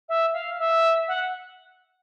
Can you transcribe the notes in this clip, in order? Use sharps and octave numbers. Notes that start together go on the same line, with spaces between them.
E5
F5
E5
F#5